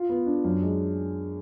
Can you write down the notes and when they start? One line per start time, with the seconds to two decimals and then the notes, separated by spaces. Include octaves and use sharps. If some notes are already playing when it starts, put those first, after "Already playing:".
Already playing: F4
0.09 B3
0.26 D4
0.44 F#2
0.62 G#3